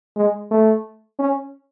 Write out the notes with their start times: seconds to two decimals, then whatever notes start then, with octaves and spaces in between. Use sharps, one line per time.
0.17 G#3
0.51 A3
1.19 C#4